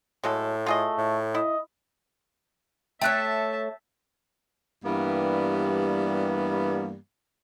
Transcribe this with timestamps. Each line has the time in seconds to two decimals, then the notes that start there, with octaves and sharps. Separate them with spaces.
0.24 A2 F#3 G#3 A4
0.66 A3 F4 G#4 D#5
0.98 A2
1.35 E4 D#5
3.02 A3 A4 C#5 E5 G5 A5 F#6
4.84 G2 E3 G3 A#3 B3